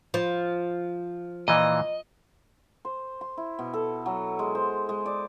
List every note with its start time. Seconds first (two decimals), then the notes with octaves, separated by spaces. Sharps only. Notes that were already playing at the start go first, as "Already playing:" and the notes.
0.14 F3
1.48 A#2 E3 D#5
2.85 C5
3.21 C6
3.37 E4
3.59 B2
3.74 A4
4.06 F#3
4.39 G#3
4.55 C5
4.89 G#3
5.06 D5